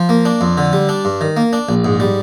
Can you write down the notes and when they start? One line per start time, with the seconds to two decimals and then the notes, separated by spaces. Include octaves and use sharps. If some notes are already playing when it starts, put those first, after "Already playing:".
Already playing: F3
0.09 A#3
0.25 D4
0.41 F2
0.58 D3
0.73 G3
0.89 D4
1.05 G2
1.21 D#3
1.37 A#3
1.53 D4
1.69 A#1
1.85 G#2
2.00 G3